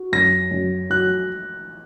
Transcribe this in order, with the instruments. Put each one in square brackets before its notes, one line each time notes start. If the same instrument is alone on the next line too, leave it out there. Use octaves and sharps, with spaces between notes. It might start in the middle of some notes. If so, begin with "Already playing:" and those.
Already playing: [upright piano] F#4
[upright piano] F#2 [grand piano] A#6
[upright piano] F#2
[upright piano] F#3 [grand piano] F#6